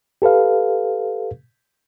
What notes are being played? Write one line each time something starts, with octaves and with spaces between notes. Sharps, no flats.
G4 A4 B4 F5